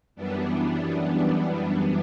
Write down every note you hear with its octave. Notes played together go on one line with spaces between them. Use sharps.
F#2 E3 G3 B3 D4